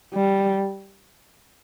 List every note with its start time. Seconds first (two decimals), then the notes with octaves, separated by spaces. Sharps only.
0.14 G3